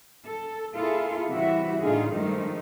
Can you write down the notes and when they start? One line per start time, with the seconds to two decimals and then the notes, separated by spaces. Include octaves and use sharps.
0.24 A4
0.76 A#3 E4 F4 G#4 A4
1.28 C3 E3 G3 E4 F#4 E5
1.82 A2 D3 D#4 F4 G#4
2.13 G2 D#3 F3 G#3 A3 D#4